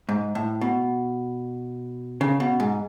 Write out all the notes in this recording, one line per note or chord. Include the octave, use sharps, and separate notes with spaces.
G#2
A2
B2
C#3
B2
G#2